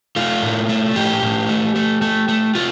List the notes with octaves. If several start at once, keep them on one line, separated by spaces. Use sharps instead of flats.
A3 F4
A2
A3
A2 G4
A2
A3
A3
A3
A3
A3 F4